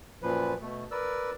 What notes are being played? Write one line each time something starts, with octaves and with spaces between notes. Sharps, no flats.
F#2 A#2 F3 B4
B2 A3
A#4 B4 D5 E6